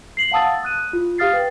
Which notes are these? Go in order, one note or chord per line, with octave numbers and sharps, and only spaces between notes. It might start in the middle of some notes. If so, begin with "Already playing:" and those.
C7 F#7
F5 F#5 A5 D#6 E6 A6
D#6 F#6 D#7
F4
G4 F5 D#6 F6 A6 C7
B4 G5